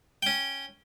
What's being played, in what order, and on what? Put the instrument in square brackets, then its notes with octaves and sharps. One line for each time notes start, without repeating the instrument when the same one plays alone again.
[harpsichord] C#4 G5